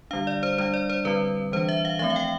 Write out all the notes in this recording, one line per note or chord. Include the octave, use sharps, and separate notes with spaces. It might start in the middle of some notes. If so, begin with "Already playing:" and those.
D3 G3 D4 F5
D5
C5
G3 D4 C5
D5
C5
D3 G3 C4 B4
E3 G3 D4 C5
E5
F5
F3 A3 C4 E5
F5
G5